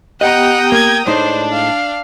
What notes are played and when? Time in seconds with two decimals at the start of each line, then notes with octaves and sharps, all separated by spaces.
0.21 B3 G4 D#5 F#5 G5 A#5 D#6
0.72 A#3 G#6
1.07 A2 G#3 D4 D#4 C5 A5
1.52 F5